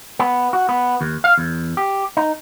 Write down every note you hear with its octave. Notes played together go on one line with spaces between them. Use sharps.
B3
F#4
B3
D#2
F5
E2
G4
D#4